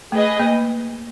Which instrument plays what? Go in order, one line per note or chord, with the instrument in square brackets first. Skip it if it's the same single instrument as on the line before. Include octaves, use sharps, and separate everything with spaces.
[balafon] A3 [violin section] G#4 B4 D#5
[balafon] A#3